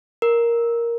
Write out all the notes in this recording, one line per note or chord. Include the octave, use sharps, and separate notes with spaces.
A#4